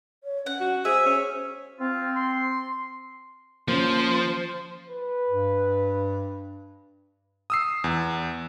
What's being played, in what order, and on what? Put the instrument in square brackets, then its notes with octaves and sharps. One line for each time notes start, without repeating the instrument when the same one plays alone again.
[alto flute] C#5
[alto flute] C#4 [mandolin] F#5
[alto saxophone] F#4
[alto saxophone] G#4 [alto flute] C5 [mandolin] E5
[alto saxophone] C#4
[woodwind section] C4 [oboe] F4
[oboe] C6
[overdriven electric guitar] F3 [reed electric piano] A#3 C#4 [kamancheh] C5
[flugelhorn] B4
[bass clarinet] G2
[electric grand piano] D#6 E6 C7
E2